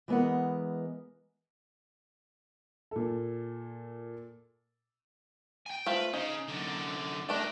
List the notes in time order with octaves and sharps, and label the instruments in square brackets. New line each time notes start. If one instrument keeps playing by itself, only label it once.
[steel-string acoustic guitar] E3 G#3 B3 A#4 F#5
[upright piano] A#2 A4
[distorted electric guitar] G5 G#5
[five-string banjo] A3 F4 C5 [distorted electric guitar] B4
[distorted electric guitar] C#3 [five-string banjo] D#4
[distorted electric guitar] F#2 D3
[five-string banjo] G3 A3 D4 [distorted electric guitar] A#4 D5